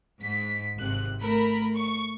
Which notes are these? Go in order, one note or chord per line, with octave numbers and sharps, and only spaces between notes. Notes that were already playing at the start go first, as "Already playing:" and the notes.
G#2 B6
G#1 C3 F#6
A3 A#4 B5
C#6